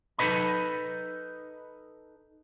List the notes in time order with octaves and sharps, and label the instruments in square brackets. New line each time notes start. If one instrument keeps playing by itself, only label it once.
[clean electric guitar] D#4 E4 A4 B4 D#5 B5